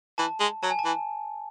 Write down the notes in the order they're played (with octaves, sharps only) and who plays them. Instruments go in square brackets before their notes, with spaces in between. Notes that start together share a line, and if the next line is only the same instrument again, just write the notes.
[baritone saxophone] E3 [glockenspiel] A5
[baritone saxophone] G#3
[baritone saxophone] F#3 [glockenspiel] A5
[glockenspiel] G#5
A5
[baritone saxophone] E3